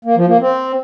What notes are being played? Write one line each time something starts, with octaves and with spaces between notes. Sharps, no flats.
A#3
F3
A#3
C4